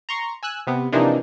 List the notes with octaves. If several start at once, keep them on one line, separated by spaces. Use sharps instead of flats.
A#5 C6 C#6
G#5 E6 F#6
C3 B3
C3 E3 F3 A#3 D4 D#4